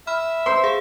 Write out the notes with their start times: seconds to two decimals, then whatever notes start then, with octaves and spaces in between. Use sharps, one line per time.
0.07 E5 B5 F6
0.46 B4 C5 C6
0.64 G#4 F5